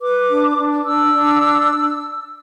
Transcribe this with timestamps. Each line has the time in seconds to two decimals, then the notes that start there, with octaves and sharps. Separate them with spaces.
0.01 B4 D6
0.30 D4
0.58 D4
0.86 D4 E6
1.14 D4